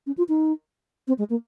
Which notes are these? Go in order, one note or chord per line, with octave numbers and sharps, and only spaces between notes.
C#4
F4
D#4
C4
G#3
A#3